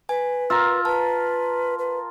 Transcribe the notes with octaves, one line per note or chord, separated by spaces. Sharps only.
B4 G#5
F4 A#4 E6
B4 A5
B4